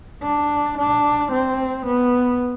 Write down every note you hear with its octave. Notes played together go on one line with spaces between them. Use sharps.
D4
D4
C4
B3